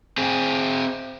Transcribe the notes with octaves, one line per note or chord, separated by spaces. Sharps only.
C4 G#4